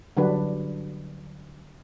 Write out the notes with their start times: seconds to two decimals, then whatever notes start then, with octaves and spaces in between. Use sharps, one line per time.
0.17 D3 F#3 G3 D4 B4